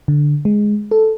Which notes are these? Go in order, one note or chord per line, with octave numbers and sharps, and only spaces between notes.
D3
G#3
A4